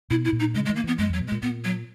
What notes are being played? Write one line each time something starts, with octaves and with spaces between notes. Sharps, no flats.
B2 E4
E4
A#2
D#4
C#3 G#3
G#3
D#3
A#3
E3 B3
F#2 G#3
E2 F#3
B2
G#3
A#2
A#2 B3
F#3